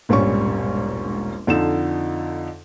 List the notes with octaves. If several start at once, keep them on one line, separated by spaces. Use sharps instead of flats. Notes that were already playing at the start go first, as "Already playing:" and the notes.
E1 A#1 G#2 G3 C#4 C#6
F2 D3 D#4 A4 E7